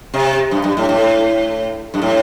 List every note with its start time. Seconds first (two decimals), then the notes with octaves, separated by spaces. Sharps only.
0.14 C3
0.51 G2
0.64 G2
0.77 A2
0.89 A2
1.94 G2
2.02 A2